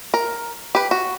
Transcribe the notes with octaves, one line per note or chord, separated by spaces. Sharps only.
A#4
G4 B4
F#4